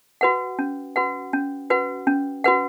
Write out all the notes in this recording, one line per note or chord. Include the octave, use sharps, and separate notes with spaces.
F#4 B4 F#5
C#4
F#4 B4 F#5
C#4
F#4 B4 F#5
C#4
F#4 B4 F#5